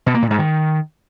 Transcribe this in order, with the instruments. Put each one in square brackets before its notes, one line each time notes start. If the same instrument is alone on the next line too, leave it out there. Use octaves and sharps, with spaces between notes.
[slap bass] B2
A#3
A#2
G#2
D#3